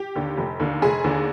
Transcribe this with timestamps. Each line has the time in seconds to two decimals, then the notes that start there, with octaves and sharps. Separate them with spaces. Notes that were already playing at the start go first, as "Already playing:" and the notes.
Already playing: G4
0.15 D#2 D3
0.37 F1
0.60 D#2 D3
0.82 F1 G#4
1.04 D#2 D3